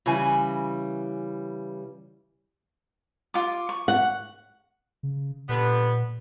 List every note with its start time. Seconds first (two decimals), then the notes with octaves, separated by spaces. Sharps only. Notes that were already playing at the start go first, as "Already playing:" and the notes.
0.06 C#3 E3 G3 G#5
3.34 F4 D6
3.69 C#6
3.88 F#5
5.03 C#3
5.49 A#2 D3 G3 B3